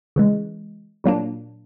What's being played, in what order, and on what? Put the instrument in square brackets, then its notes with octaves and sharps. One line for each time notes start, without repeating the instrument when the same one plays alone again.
[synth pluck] C#3 E3 G#3
A#2 F#3 A#3 D4